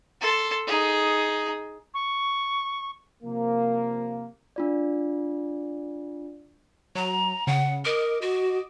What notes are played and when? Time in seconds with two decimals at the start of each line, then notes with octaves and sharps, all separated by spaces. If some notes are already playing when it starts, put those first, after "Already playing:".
0.21 A4 C6
0.67 D#4 G#4
1.94 C#6
3.23 C3 F3 A#3
4.56 D4 F4 D5
6.95 F#3 A#5
7.47 C#3 F#5
7.85 A#4 D#5 D6
8.22 F#4